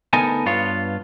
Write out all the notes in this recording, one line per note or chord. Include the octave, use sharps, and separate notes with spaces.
D2 B3 D#4 A4 A#4 G#5
G2 B3 F4 C#5